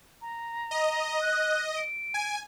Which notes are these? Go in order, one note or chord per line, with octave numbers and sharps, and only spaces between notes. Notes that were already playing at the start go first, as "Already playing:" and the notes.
A#5
D#5
F#6
D7
G#5